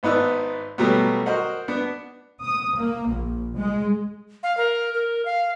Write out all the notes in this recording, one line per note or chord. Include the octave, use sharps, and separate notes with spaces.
G#1 B3 D#4 B4 D5 E6
B2 F#3 G3 A3 B3
F#4 A#4 C5 D#5 F#5
B3 D4
D#6
A#3
A#1
G#3
F5
A#4
A#4
F5